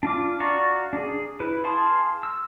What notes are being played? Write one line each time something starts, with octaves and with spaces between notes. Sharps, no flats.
D4 F4 D6
F#4 D5 F5 A#5 C#6
D4 G#4
E4 B4
G#4 F5 A5 C6
E6